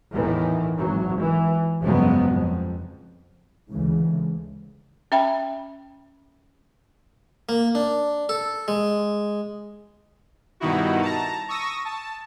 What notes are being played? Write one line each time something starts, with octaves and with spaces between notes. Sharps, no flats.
E2 A2 D#3 E3
G#1 F#3
E3
G1 F2 C#3 F#3 G#3 B3
F2
D2 C#3 E3 G#3
C#4 E5 G5 B5
A#3
D4
A4
G#3
G2 B2 D#3 D#4 E4 F#4
A5 A#5
C#6 D#6 E6 A#6
A5